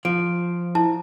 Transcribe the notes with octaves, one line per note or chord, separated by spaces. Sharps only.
F3 D7
E4 A5